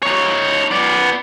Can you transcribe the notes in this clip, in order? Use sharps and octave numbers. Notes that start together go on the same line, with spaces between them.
D#4 C#5
B3 D5